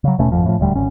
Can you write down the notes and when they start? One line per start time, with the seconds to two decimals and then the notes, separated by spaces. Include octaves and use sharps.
0.04 C#3 F#3
0.19 D#1 B2 A3 C#4
0.32 G#1 F2 F3
0.46 A2 F3
0.60 D#1 D2 G3
0.75 G#1 C#4